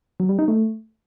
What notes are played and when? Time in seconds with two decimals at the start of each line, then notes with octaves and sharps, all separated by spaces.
0.20 F#3
0.29 G3
0.39 D#4
0.48 A3